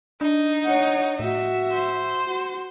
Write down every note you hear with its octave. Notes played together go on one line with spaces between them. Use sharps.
D4 D#4
C#5 F#5
A2 F#4 E5
C5
F#4